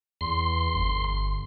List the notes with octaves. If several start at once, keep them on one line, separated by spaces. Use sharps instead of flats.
E2 C6
G1